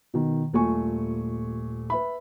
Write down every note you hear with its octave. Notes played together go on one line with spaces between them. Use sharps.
B2 D#3
D#1 A#2 A3 G#5 C#6
B4 E5 B5